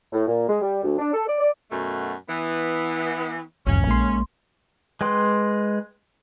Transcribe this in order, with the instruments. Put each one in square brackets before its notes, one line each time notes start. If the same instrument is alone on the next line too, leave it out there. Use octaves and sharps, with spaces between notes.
[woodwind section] A2
A#2
G#3
G3
D2
D4
A4
D5
D5
[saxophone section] F#2 B2 A3
E3 B3
[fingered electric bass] F1 E2 G#2 [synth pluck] B1 [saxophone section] C#4
[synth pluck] A#1 C6 [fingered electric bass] G#3 A#3
[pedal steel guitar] G#3 B4 G5 C6